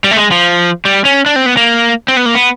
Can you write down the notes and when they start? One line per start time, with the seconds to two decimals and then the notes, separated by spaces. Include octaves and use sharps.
0.04 G3
0.11 A3
0.17 G#3
0.31 F3
0.85 G3
1.05 C#4
1.26 D4
1.36 C4
1.46 B3
1.57 A#3
2.08 C4
2.17 B3
2.26 A#3
2.35 B3